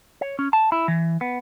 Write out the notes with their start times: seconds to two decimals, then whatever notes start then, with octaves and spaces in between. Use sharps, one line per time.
0.21 C#5
0.39 C#4
0.53 A5
0.72 E4
0.88 E3
1.21 B3